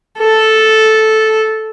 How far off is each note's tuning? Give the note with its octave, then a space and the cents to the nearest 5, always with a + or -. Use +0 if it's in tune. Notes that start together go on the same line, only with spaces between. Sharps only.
A4 -5